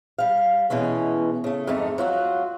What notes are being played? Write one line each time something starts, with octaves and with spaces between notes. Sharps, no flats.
G3 F5
B2 E3 G#3 C#4
C#3 A3
F2 G#2 A3 D#4
F#3 F4 F#4